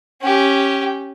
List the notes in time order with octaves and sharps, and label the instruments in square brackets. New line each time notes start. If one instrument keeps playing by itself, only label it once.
[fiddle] C#4 G4